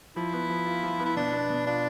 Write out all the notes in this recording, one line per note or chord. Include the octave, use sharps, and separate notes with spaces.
F3 E4
B3
F3
F4
F3
B3
E4
B2 D4
B3
B2
D4 F4